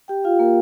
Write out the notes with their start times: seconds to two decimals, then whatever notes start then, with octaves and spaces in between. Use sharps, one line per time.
0.08 G4 G5
0.24 F4 F5
0.39 A#3 A#4